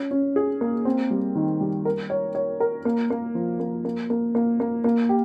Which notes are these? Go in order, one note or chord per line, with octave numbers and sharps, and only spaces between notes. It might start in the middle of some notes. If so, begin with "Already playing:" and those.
Already playing: C#4
C#4
G#4
A#3
C4
G3
D#3
G3
A#4
C#5
C#5
A#4
A#3
A#3
F3
A#3
A#3
A#3
A#3
A#3
A#3
G4